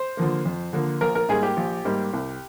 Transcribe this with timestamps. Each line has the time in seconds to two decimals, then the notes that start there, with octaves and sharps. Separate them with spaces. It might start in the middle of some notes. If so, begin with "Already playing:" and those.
Already playing: C5
0.17 D3 F3 A#3
0.45 F2
0.73 D3 F3 A#3
1.01 A#1 A#4
1.15 A#4
1.29 G#2 G3 A#3 G#4
1.43 G4
1.57 A#1
1.85 G#2 G3 A#3
2.13 C2